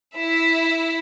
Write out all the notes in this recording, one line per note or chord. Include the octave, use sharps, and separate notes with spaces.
E4 E5